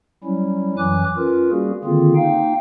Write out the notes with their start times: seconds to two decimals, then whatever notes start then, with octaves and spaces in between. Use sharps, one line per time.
0.24 F#3 G3 C#4 E4
0.78 F#2 E3 F#3 G#5 D6 F#6
1.17 C#4 F4 A#4 B4
1.51 G3 A#3 C#4 F#4 G#4
1.85 D3 D#3 A#3 C4 F4 G#4
2.15 A#3 D#4 F5 G5